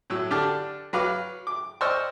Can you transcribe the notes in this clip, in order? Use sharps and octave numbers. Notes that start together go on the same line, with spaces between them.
A2 F#3 E6
D3 D4 G4 D6 F6
F#3 B4 F5 D6 F6
D6
C5 D5 D#5 C#6 E6 F6